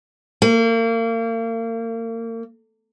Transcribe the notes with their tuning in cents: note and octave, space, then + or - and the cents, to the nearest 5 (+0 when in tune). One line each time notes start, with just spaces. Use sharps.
A#3 -35